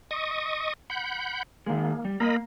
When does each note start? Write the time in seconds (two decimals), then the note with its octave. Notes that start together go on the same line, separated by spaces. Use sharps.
0.11 D#5 C#6 D#6
0.90 F#5 B5 G6
1.66 D#3 G#3 A#3
2.05 G3
2.20 A#3 A#4 D#5 A#5 B5